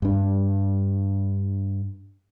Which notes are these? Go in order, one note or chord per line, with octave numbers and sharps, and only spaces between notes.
G2 D4